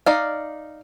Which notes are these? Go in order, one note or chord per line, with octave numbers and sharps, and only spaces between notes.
D#4 D5 F5